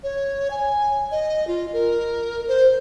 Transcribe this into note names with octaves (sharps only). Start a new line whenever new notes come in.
C#5
G#5
D#5
F4
A#4
C5